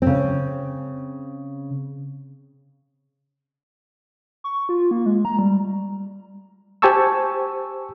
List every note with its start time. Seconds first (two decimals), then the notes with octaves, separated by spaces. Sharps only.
0.02 C#3 C4
4.44 C#6
4.69 F4
4.91 A#3
5.06 G#3
5.25 A#5
5.39 G3
6.82 G4 C5 G#5 A5 C#6 E6